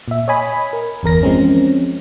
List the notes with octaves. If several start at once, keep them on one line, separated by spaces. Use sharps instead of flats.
A#2 E5
C#5 D#5 G#5 B5
A#4
G1 E2 A#4 A#6
F3 G#3 C4 C#4